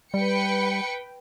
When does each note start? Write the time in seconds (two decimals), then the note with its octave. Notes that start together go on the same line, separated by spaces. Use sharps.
0.14 G3 B4 G5 C#7